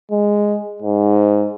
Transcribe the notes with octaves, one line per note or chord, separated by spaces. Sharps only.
G#3
G#2